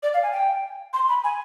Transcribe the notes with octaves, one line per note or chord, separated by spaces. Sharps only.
D5
F5
G#5
G5
C6
B5
G#5